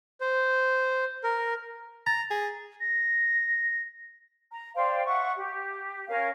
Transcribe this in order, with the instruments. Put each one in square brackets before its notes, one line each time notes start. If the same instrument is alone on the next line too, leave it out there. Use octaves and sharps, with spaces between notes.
[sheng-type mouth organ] C5
A#4
[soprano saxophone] A#5 [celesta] A6
[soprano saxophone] G#4
[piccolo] A#6
[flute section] A#5
C5 D5 F5 G5
E5 F#5 C#6
G4
C#4 A#4 C#5 F5